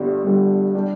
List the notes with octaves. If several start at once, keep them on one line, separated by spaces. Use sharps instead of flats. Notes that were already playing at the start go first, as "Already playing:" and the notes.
Already playing: G1 G2 D3 G3
G1 G2 D3 G3
G3 D4 G4